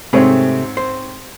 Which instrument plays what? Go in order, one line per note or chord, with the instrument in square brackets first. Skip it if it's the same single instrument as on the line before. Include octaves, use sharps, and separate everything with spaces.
[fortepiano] G#2 C4 C#5 [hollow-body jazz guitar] C3 A3 G#4
[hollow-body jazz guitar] C5